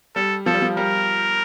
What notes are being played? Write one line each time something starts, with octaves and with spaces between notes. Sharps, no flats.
G3 A4
F3 A4
G3
F3
G3 A#4